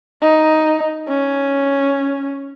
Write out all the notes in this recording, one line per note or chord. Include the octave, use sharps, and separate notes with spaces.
D#4
C#4